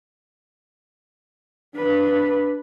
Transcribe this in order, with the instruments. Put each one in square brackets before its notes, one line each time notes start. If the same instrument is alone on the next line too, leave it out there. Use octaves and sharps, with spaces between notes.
[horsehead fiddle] D4 B4